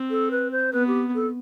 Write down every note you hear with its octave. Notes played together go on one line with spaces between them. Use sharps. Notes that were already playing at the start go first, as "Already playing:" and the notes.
Already playing: C4
A4
B4
C5
B3 B4
G4
A4